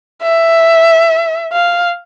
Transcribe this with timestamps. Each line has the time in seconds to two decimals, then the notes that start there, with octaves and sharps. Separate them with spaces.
0.22 E5
1.53 F5